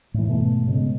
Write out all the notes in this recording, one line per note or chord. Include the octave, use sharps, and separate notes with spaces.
A2 E3
G#2 B2 A3
C#3 G#3 B3